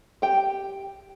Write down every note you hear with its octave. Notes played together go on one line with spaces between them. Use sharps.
G4 G5